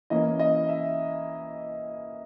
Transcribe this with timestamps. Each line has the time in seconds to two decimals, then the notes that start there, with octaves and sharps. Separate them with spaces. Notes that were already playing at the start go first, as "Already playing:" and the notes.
0.10 E3 A#3 C#4 D#5
0.39 D#5
0.69 E5